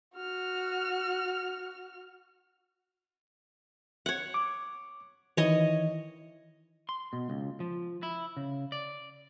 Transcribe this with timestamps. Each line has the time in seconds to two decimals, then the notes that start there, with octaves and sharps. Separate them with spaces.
0.15 F#4 F6
4.06 C#5 F#5
4.34 D6
5.37 D#3 E3 E4 C#5 D#5
6.89 C6
7.13 B2
7.30 C#2
7.60 F3
8.03 E4
8.37 C#3
8.72 D5